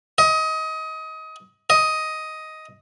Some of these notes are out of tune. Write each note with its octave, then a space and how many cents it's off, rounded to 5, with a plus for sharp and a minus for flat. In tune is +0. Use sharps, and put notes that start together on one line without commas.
D#5 +25
D#5 +10